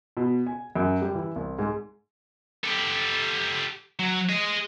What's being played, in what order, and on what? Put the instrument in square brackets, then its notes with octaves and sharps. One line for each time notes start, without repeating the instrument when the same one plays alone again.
[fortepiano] B2
G#5
F#2
G3
E3
C2
G#2
[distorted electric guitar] G4 A4
F#3
G#4 D#5